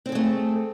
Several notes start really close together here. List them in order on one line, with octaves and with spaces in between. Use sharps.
C4 A4 G#4 A3